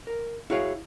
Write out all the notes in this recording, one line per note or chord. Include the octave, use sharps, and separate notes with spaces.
A#4
E4 F#4 G#4 C#5 F5